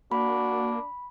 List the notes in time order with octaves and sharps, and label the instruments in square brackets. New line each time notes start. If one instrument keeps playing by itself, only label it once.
[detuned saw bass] A#3 [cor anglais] D4 [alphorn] F#4 [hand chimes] B5